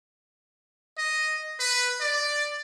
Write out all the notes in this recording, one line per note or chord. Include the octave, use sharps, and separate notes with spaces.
D#5
B4
D5